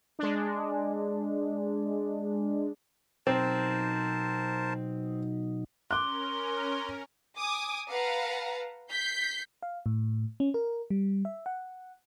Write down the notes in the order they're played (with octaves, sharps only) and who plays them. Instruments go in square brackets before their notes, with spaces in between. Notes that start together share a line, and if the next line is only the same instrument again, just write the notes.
[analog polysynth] G#3 D4
[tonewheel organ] B2 F#3 D#4 [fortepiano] C4 [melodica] A#4 C5 A5
[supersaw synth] C#4 A#4 [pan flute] C6 [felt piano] D6 F#6
[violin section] G#5 D6 D#6
B4 F5 F#5 A5 A#5
G6 B6 C7
[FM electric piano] F5
A2
C#4
A#4
G3
E5
F#5